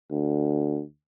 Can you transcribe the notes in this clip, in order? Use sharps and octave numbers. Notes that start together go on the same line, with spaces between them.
D2